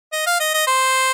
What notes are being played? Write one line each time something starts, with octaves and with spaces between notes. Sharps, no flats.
D#5
F5
D#5
D#5
C5